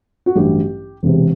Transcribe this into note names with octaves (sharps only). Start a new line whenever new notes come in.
F#4
A1 G2 F#3 G4
E1 E2 C3